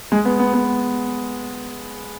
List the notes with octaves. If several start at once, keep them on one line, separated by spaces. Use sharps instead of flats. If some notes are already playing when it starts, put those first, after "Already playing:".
G#3
B3
B3
B3